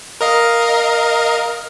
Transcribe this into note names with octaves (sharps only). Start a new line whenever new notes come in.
A#4 D#5 F5